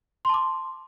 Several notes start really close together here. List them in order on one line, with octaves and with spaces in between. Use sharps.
C6 A5 D6